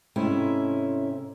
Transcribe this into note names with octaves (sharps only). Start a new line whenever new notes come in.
G#2 C3 A3 C#4 E4